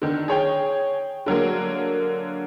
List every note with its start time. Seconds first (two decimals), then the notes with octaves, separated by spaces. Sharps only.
0.02 D3 D#3
0.28 G#4 C#5 G5
1.26 D3 F#3 G#3 A#3